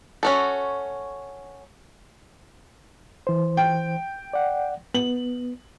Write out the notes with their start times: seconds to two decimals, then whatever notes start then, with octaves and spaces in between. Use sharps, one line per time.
0.23 C#4 F#4 A4
3.27 E3 C5
3.57 G5
4.33 D5 F#5
4.94 B3 F#7